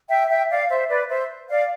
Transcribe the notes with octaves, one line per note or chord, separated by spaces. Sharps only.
E5 G5
E5 G5
D5 F5
C5 E5
B4 D5
C5 E5
D5 F5